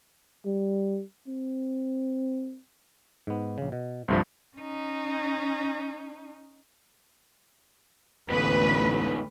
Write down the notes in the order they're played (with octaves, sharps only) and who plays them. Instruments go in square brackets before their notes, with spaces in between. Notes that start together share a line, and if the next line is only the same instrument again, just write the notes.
[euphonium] G3
C4
[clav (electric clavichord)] G#2 B3
A#1 C#3
B2
[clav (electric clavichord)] G1 A3 C5 [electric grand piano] C2 G2 F3
[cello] C#4 D#4
[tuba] A1 [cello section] D2 B4 [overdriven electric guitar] G#2 B3